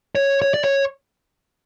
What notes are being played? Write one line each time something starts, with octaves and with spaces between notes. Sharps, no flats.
C#5
C#5
D5
C#5